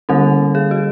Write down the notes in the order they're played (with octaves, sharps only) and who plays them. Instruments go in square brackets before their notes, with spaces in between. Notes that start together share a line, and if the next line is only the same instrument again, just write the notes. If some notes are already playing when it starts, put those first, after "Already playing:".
[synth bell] D3 G3 A#3 C#4 A4
G#4
F#4